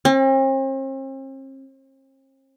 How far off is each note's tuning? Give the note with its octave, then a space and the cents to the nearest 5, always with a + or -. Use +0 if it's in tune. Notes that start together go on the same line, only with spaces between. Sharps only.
C4 +45